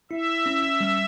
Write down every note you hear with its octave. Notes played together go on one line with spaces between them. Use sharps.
E4 E5
C#4
G3